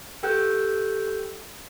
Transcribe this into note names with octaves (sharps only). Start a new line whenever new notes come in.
G4 A4 G5 E6 F#6 G6